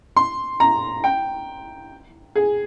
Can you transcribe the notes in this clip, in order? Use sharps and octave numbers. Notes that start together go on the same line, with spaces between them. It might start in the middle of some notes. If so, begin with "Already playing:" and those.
C6
A#5
G5
G#4